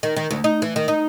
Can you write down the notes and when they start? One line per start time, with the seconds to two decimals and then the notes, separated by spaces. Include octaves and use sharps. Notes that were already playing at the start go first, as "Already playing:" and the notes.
0.03 D#3
0.16 D#3
0.31 D2
0.44 D#4
0.62 E3
0.76 D#3
0.88 D#4